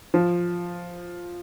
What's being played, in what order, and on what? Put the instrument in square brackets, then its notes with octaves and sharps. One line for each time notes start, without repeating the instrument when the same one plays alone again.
[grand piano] F3